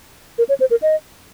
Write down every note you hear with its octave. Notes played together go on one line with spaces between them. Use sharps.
A#4
C#5
C5
A#4
D#5